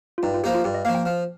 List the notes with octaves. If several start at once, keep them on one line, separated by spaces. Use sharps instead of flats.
F4
G2 D#4
F4
F3 A#3 D#4 G4
F4
G2 G4
D#5
F3 A#3 F5
G5
F3